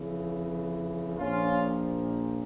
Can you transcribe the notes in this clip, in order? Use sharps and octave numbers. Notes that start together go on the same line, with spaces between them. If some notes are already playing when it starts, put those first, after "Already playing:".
Already playing: F2 C#3 E3
A#1 A#2 F3 C#4 F4